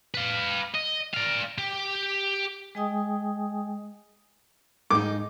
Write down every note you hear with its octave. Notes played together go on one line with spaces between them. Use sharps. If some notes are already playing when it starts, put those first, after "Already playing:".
B4 F5
D#5
D5 F5
G4
G#3 G#4 D#5 G5 G#5 D#6
G#2 D#4 D6